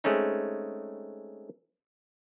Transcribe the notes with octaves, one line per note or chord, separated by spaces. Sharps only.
G#3 A3 C4 C#4 D#4